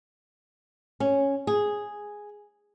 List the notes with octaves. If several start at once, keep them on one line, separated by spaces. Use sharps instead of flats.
C#4
G#4